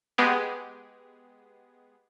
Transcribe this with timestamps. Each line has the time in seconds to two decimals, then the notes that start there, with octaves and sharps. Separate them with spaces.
0.18 G#3 B3 G4 G#4